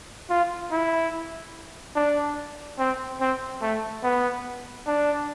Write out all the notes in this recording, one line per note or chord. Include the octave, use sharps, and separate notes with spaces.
F4
E4
D4
C4
C4
A3
B3
D4